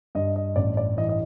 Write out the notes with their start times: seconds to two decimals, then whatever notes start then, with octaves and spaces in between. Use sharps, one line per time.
0.15 G2 D#5
0.36 D#5
0.56 A1 D5
0.77 D5
0.97 E3 D#5
1.09 D#5